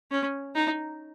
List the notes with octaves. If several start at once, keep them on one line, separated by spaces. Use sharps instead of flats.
C#4
D#4